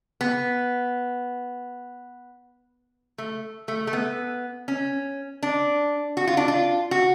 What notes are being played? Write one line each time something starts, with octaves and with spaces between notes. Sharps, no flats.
B3
A3
A3
A3
B3
C#4
D4
F#4
F4
D4
F4
F#4